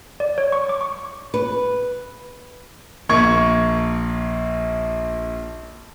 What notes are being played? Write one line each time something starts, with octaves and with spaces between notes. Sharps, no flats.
D5
C#5
C#6
D6
C#6
B4
A#1 A#3 C#6 G#6